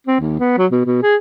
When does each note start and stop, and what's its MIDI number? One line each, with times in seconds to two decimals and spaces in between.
0.07 0.18 60
0.20 0.35 39
0.39 0.57 59
0.58 0.67 54
0.71 0.81 47
0.86 0.99 47
1.03 1.16 68